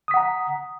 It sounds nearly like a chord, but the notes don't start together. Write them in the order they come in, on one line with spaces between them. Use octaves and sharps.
D#6 B6 F#5 A#5